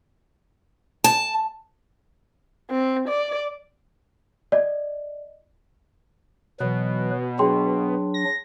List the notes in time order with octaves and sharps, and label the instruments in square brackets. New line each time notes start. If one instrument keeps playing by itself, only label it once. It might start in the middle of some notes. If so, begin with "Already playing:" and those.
[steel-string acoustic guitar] A5
[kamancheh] C4
D5
[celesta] D5 D#5
[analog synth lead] B2 [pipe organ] E3 F#3 B4
[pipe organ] F#3 D4 [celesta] G#4 G5 C6
[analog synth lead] A#6